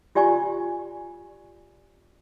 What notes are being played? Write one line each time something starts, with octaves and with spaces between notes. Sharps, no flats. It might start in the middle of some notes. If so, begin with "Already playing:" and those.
F4 G4 D5 G#5 C#6